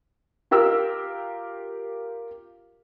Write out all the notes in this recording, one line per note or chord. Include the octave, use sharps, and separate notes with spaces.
F4 G4 A#4 F5 E6